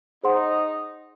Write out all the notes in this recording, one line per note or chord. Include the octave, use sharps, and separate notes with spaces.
D#4 G#4 C5 F#5 C6